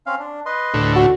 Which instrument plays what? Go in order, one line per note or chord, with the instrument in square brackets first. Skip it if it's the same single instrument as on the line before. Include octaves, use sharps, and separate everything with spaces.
[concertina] C4 C#4 F5
D4
B4 D#5 C6
[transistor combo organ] D2 A2
[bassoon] F#4